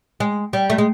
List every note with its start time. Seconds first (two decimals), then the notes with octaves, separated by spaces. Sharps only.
0.20 G#3
0.53 G3
0.70 A3
0.78 G#3